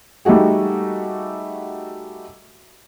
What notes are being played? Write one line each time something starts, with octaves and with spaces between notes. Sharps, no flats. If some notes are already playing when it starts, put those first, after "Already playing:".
G3 A3 D#4 F#4 G#4